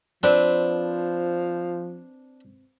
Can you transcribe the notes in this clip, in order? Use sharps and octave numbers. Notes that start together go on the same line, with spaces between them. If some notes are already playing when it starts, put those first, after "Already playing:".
F3 C4 D4 B4 E5